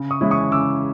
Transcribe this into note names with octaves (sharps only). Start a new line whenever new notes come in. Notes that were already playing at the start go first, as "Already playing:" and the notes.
Already playing: C#3
C#6 D#6
E3 G#3 C#4 E4
C#6 D#6
C#3 D6 E6